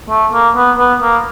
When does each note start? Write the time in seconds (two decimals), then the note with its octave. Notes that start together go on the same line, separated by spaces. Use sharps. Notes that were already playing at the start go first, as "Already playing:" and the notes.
0.10 A3
0.33 A#3
0.56 B3
0.79 B3
1.02 A#3